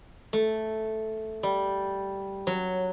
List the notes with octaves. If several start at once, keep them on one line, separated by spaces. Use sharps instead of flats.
A3
G3
F#3